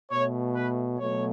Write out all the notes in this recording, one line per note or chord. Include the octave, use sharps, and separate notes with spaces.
B2 A3 C#5
B4
B2 F#3 A3 C#5